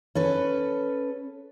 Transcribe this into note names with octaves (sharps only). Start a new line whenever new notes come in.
C#4 A4 B4